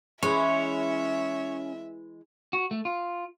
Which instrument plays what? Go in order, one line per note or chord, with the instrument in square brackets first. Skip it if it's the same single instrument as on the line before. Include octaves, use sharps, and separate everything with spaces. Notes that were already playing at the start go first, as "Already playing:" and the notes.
[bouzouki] E3 G#3 [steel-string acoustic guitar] C#4 [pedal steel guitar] C#5 [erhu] E5
[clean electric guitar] F#4
A3
F4